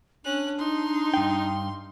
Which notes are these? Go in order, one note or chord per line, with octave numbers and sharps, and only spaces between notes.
C#4 D4 F#6
D#4 C6
G2 G5